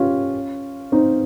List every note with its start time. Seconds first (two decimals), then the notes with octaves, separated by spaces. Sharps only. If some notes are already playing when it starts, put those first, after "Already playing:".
Already playing: C#4 F4 G4
0.92 C4 D#4